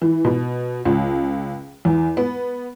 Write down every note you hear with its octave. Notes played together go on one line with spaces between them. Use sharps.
E3
B2
C#2
E2
B3